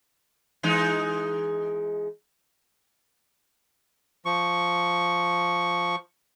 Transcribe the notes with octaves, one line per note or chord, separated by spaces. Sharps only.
E3 G#3 D#4
F3 C#6